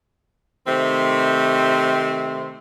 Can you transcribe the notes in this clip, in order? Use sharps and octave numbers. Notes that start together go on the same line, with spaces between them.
C3 D#3 A3 C4